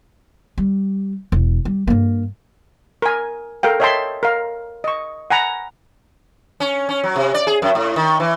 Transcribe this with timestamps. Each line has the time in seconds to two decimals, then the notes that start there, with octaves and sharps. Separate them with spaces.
0.58 G3
1.32 E1
1.65 G3
1.88 G2 A#3
3.02 A#4 G#5
3.63 A4 A#4 F5 G5
3.80 C#5 D#5 E5 G5 A5 C6
4.23 A#4 F5
4.84 D#5 C#6
5.30 F#5 G#5 A#5 B5
6.60 C#4
6.89 C#4
7.04 F#3
7.16 C3
7.34 D5
7.47 G#4
7.62 F#2
7.75 A2
7.96 D#3
8.20 E3